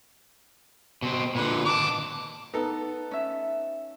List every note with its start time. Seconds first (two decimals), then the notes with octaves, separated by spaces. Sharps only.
1.02 B2 C4
1.35 A#2 D3 B4
1.65 D#3 A5 D6
2.53 B3 D#4 A4
3.11 C#4 E5